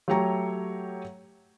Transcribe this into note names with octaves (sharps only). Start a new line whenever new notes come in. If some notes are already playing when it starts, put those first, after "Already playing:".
F#3 A3 G4 C#5 G5 A#5